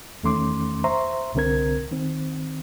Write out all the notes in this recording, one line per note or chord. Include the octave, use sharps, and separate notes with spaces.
E2 D#3 A3 C#4 C6 D6
C5 E5 A#5 C6 C#6
C2 D3 C4 A#4 G#6
D#3 C4